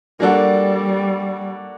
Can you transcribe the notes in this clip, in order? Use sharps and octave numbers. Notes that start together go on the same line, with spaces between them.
G3 A#3 D4 F#4 A4